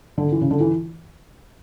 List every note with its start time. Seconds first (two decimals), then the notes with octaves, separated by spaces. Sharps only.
0.18 D3
0.32 E3
0.41 C#3
0.51 D3
0.61 E3